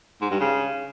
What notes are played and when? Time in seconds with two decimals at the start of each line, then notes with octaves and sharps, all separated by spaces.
0.21 G#2
0.31 G2
0.40 C#3